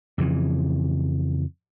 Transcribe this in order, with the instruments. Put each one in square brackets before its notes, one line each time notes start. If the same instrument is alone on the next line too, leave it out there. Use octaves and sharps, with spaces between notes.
[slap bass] F2 C#3 E3